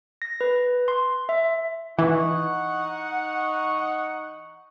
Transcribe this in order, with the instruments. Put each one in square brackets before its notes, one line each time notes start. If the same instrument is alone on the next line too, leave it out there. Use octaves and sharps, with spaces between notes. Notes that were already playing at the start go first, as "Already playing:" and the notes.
[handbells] A#6
B4
C6
E5
[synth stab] E3 [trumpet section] D#4 C#6 [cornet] F#5